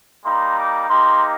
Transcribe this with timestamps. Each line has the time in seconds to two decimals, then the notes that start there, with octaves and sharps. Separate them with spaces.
0.24 G3 A#3 D#4 C6
0.56 D6
0.90 A#3 D#4 G4 C6